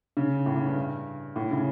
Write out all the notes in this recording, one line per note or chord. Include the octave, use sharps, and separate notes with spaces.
C#3
A2
A2
G2
A2
C#3